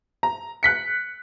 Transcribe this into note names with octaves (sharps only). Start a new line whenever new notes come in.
A#5
F#6 B6 C#7